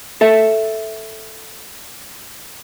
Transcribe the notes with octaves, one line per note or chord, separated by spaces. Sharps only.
A4 E5